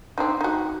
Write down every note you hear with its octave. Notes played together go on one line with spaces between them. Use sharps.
C4 D4 D#4
D#4 F#4